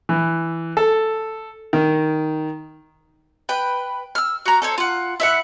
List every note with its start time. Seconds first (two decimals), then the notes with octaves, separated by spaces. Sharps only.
0.09 E3
0.77 A4
1.73 D#3
3.49 B4 G5
4.15 E6 F6
4.46 F#4 A#5
4.62 A4 C5 C#5
4.78 F4 F#5
5.20 E4 E5 F#5